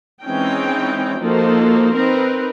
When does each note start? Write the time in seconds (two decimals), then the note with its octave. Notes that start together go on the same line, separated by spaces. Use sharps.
0.23 E3 G#3 C4 C#4 D#4 G5
1.19 F3 A#3 D#4 F#4 A4 C5
1.95 C4 D#4 A#4 B4